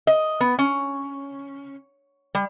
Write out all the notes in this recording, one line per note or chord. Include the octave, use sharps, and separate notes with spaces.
D#5
B3
C#4
G3